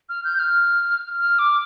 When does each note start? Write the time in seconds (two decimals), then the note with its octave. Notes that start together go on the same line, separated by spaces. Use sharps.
0.09 F6
0.24 G6
0.39 F6
1.18 F6
1.39 D6